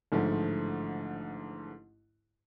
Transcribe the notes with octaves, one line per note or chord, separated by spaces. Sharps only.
A1 G#2 D3 F3 A3